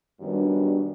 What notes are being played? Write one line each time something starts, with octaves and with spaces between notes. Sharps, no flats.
F#2 D#3 G3 B3 D4